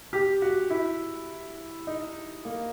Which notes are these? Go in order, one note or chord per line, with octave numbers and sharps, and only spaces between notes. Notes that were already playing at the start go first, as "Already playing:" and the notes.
G4
F#4
E4
D#4
A#3